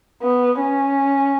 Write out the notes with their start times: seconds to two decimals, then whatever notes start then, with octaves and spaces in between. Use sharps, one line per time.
0.22 B3
0.60 C#4